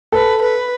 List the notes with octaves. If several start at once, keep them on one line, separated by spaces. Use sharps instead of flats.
A4 B4
B4